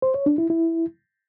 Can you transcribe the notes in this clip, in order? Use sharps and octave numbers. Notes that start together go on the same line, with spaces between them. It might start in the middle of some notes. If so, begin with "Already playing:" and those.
C5
C#5
D4
E4
E4